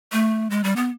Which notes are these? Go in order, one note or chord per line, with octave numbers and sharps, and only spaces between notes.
A3
G#3
G3
B3